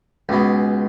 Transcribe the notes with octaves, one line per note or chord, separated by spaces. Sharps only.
C#2 B2 G#3